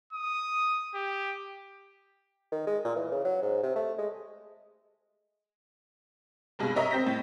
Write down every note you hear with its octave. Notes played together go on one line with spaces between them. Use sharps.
D#6
G4
D#3
G#3
A#2
E3
C#3
F#3
G#2
C3
A3
G#3
F1 G2 B2 G#3
A#4 C#5 D#5 E5 A#5
C4 G6 A#6 B6
A2